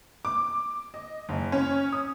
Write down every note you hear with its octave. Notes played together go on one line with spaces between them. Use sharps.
D6
D#5
F#1
C#4
D#6